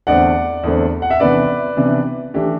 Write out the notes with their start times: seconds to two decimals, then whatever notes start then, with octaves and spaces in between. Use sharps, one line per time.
0.07 E2 D3 A3 C4 D5 F#5
0.63 E2 D3 A3 C4
1.02 F#5
1.10 E5
1.20 C3 E3 B3 D4 B4 D5
1.77 C3 E3 B3 D4
2.34 E3 A3 D4 G4